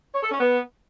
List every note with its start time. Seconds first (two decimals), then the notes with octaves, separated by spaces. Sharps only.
0.14 C#5
0.23 A4
0.31 C#4
0.40 B3